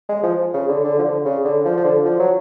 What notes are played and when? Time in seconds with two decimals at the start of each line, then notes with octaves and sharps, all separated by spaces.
0.09 G#3
0.23 F3
0.54 C#3
0.69 D3
0.84 D3
0.99 F3
1.04 D3
1.24 C#3
1.45 D3
1.64 F3
1.77 F3
1.84 D3
2.05 F3
2.19 F#3